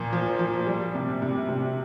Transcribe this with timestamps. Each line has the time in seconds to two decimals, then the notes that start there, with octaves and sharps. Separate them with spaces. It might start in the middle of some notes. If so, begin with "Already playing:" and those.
Already playing: A#2 F3
0.13 F3
0.39 F3
0.67 G3
0.95 C3
1.22 C3
1.49 C3